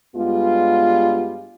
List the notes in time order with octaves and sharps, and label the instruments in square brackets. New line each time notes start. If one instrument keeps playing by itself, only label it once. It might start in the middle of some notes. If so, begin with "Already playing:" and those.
[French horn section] G2 G3 G#3 B3 F4